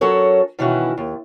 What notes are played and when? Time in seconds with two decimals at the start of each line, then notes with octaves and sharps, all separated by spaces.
0.01 F#3 C#4 F#4 A4 A#4 C#5
0.59 B2 D#3 E3 C#4 E4 F#4
0.98 D#2